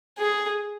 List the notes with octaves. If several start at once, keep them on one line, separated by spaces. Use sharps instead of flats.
G#4